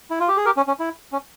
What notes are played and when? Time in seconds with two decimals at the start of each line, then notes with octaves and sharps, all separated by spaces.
0.10 E4
0.20 F4
0.28 G4
0.37 G#4
0.45 G4 A#4
0.57 C#4
0.68 C#4
0.79 E4
1.12 C#4